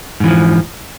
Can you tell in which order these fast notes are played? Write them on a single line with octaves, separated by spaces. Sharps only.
G#2 E3 F3